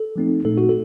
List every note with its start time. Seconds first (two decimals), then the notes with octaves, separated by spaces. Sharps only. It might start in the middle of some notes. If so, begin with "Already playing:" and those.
Already playing: A4
0.16 F3 A3 C4 D#4
0.45 A#2 A3 D#4 A4
0.58 F#4
0.69 A4